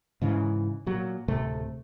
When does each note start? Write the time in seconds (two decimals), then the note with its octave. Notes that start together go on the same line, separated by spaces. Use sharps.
0.22 G#2 C#3 E3
0.86 A#2 F#3
1.28 D1 C3 A3